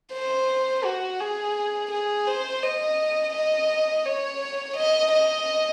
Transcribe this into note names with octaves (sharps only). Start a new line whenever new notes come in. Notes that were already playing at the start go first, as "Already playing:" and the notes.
C5
F#4
G#4
G#4
C5
D#5
D#5
C#5
D#5
D#5